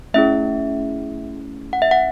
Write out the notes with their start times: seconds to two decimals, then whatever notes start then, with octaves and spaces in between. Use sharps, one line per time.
0.14 A3 C#4 E4 G#4 E5
1.73 F#5
1.82 E5
1.91 F#5